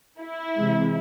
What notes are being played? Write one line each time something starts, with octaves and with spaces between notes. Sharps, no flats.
E4
C3 E3 G#3